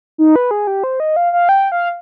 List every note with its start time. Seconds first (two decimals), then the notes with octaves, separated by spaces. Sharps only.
0.18 D#4
0.36 B4
0.51 G#4
0.67 G4
0.84 C5
1.00 D#5
1.16 F5
1.33 F5
1.49 G5
1.72 F5